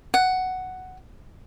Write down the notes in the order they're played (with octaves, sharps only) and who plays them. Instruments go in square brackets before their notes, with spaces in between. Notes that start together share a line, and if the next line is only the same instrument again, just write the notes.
[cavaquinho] F#5